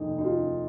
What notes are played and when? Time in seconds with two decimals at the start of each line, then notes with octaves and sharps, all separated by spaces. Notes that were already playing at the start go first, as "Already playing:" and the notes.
Already playing: F1 D#2 D#4
0.18 D#4
0.24 F4